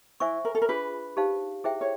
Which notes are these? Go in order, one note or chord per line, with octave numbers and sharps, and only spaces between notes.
E4 C5 E5 G#5 C#6
A#4
A4
A#4
D4 F4 G#4 B4
D#4 G4 C5 F5 A5
E4 G#4 C5 E5 G5
C#5